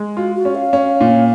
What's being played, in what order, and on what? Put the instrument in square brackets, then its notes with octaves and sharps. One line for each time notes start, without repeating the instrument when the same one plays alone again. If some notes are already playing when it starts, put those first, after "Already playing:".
Already playing: [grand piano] G#3
[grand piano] F4 [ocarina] F#4
[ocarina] F#4
[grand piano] C#4
[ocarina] F5
[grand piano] C#4
A#2